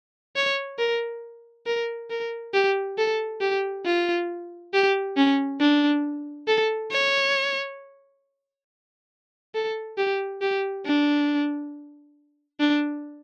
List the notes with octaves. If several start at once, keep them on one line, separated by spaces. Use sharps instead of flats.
C#5
A#4
A#4
A#4
G4
A4
G4
F4
G4
C#4
D4
A4
C#5
A4
G4
G4
D4
D4